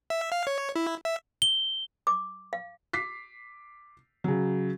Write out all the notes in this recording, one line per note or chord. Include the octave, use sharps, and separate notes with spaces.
E5
F5
C#5
E4
E5
G7
D6
F5
D6 B6 C7
C#3 F#3